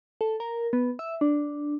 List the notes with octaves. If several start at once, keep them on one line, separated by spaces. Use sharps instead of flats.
A4
A#4
B3
E5
D4